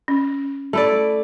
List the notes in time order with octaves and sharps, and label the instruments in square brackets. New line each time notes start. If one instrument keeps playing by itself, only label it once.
[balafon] C#4
[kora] A3 E4 D5